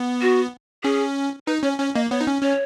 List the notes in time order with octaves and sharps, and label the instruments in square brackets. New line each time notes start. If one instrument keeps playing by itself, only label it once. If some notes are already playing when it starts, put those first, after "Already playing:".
Already playing: [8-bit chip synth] B3
[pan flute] F#4
[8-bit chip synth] C#4 [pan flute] G#4
[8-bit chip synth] D#4 [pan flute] B4
[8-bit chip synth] C#4 [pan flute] C#5
[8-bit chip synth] C#4 [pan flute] C#5
[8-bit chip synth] A#3 [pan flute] D#5
[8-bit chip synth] B3 [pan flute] C#5
[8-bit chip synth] D#4
C#4
[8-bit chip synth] C#4 [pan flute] C#5